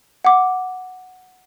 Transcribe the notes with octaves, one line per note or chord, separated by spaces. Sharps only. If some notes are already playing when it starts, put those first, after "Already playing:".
F#5 D6